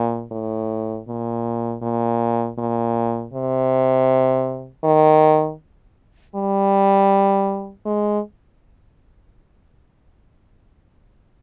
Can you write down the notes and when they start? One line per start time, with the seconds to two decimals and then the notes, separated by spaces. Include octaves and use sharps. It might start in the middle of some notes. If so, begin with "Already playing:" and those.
Already playing: A#2
0.31 A2
1.08 A#2
1.82 A#2
2.59 A#2
3.33 C3
4.84 D#3
6.36 G3
7.86 G#3